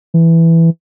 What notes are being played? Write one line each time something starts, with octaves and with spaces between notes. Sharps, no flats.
E3